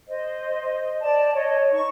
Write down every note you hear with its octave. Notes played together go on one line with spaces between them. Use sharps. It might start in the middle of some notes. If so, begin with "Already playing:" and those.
C5 D#5
D5 A5
C#5 D#5
D#4 C#6